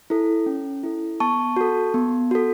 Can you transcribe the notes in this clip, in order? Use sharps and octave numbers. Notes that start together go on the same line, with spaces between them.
E4 A4
C#4
E4 A4
B3 A5 C#6
F#4 A4
B3
F#4 A4